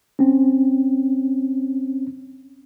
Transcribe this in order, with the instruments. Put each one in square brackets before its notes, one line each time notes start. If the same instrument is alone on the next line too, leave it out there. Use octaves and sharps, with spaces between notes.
[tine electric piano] C4 C#4